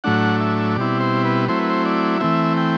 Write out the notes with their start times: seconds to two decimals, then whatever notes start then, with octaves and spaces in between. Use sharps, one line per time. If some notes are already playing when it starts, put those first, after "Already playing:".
0.04 A2 F#3 A3 D4 F#5
0.40 E5
0.76 B2 G3 C4 E4 D5
1.00 C5
1.25 B4
1.48 F#3 A3 C4 E4 C5
1.59 B4
1.70 C5
1.86 D5
2.20 E3 A3 C4 E5
2.57 G5